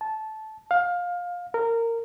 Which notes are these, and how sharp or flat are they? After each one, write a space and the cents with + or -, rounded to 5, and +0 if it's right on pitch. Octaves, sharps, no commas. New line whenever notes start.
A5 -15
F5 +20
A#4 -20